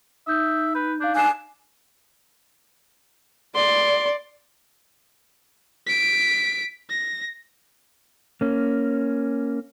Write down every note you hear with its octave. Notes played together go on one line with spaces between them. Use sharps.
D#4 E5 D#6 G6
B4 G6
D4 F5 G6
D4 G#5 F#6 C7 E7
D5 C6
B6 D7
A#6
A#3 C#4